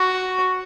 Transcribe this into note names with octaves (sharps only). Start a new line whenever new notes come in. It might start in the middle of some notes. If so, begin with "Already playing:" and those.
Already playing: F#4